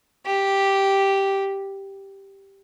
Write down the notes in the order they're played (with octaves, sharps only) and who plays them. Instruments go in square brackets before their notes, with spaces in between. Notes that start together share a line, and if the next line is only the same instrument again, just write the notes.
[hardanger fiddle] G4